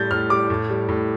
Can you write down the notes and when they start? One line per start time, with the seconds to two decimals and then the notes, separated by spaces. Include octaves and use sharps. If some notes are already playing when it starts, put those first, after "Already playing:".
Already playing: A2 G3 G6 A6
0.11 A2 F6
0.30 G3 D6
0.50 A2
0.70 G3
0.89 A2